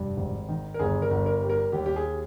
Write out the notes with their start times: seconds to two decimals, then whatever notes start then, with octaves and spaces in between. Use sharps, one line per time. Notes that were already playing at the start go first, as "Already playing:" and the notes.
Already playing: F1 G2
0.17 G#1
0.49 D#3
0.74 A#4
0.79 G1 G#4
1.02 A#4
1.11 G1
1.26 A#4
1.42 G3
1.50 A#4
1.72 D#2 G4
1.86 G4
1.96 G#4